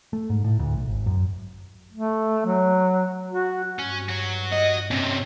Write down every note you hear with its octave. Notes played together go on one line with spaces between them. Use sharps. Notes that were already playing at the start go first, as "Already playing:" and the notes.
A3
G#2
A2
D2
B1
G#1
F#2
A3
F#3
F#4
G2 C#4
F#4 C#5
D#5
C3 C4 C#4